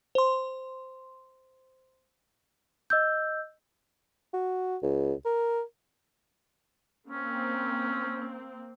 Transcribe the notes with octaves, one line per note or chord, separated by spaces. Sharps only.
C5 C6
D#5 E6 G6
F#4
C#2
A#4
A#3 C4 C#4